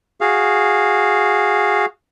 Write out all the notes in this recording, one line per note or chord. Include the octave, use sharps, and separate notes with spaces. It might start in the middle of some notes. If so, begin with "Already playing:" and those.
F#4 G#4 F5